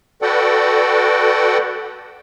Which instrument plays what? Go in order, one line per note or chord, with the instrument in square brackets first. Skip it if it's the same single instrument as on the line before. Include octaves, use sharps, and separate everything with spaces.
[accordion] F#4 A4 B4 D5 F#5 G5